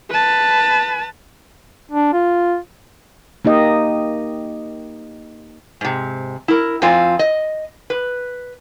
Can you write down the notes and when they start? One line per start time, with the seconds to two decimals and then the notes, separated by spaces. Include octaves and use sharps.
0.10 B4 A5
1.91 D4
2.13 F4
3.45 A#3 D#4 G4 D#5
5.81 G#2 C3
6.48 E4 A#4
6.82 F2 C4 F4 G#5
7.19 D#5
7.90 B4